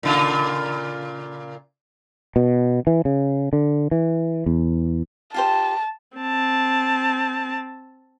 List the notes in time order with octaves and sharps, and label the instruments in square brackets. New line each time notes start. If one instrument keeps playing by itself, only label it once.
[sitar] A#2 C#3 F4
[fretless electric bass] B2
E3
C#3
D3
E3
E2
[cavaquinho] F4 G4 C5 [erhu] A5
[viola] C4 A5